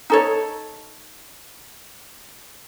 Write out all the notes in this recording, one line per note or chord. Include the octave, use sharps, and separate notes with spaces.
D#4 A4 C#5